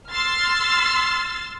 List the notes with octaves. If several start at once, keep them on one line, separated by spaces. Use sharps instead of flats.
C6 E6 F6 A6